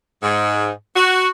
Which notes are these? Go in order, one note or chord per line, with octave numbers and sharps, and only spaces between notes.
G#2
F#4